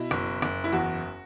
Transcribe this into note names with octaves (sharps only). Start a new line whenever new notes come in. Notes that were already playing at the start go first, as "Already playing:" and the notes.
Already playing: B2 E4
F#1
F#1
E4
E2 F#4